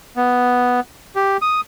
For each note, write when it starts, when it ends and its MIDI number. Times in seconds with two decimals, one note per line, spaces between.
0.17 0.80 59
1.16 1.37 67
1.42 1.61 87